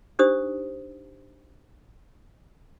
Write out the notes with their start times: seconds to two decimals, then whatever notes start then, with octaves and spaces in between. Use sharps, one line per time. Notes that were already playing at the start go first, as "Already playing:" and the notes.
0.19 D4 D#4 G4 C5 D#6